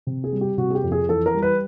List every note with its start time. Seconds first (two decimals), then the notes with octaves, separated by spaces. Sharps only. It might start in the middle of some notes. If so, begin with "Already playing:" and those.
0.07 C3
0.24 G#4
0.32 G3
0.41 G4
0.58 C3 F#4
0.70 G#4
0.75 G4
0.83 F2
0.92 G#4
1.09 E3 A4
1.26 A#4
1.34 G3
1.42 B4